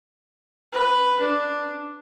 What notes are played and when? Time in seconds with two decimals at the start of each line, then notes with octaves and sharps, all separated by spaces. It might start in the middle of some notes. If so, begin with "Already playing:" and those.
0.72 B4
1.20 D4